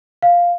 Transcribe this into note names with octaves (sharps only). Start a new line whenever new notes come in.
F5